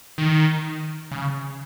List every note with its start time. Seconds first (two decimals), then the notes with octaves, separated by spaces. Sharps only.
0.18 D#3
1.12 C#3